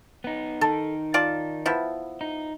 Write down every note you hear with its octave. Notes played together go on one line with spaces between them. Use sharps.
B3 D#4
D#3 D#4 A4
F4 D5 A5
F3 B3 E4
D#4